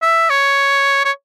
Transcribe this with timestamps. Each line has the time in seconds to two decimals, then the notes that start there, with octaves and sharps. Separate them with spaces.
0.02 E5
0.30 C#5
1.05 C#5